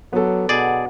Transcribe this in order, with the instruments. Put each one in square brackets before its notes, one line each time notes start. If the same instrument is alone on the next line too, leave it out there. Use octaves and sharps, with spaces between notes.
[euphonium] F#3 [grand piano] B3 A4 [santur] D4 C#5
[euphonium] B2 [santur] F#3 F#5 [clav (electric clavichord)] G#4 D5